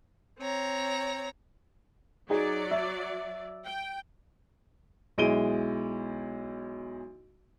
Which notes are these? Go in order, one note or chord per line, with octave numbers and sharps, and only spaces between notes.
C4 C#5 A#5
F#3 D#4 G#4 D5
E5
G5
B1 G#3 E4 D7 D#7 G7